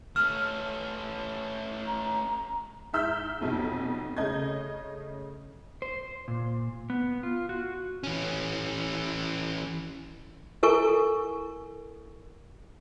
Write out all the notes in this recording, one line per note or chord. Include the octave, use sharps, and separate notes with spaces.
A3 C#4 F6
A#5
G#2 E5 E6 F6 G6 B6
F1 B1 F2
C#3 A3 D#5 G6 G#6
C5
A#2
B3
F4
F#4
E3 C#4
E4 A4 A#4 G#5 C#6